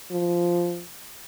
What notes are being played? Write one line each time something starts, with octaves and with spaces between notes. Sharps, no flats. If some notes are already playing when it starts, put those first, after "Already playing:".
F3